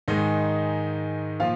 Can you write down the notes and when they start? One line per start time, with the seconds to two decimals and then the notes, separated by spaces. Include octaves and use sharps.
0.08 G#2 D#3 G#3 D#4 D#5
1.40 A#2 F3 F4 F5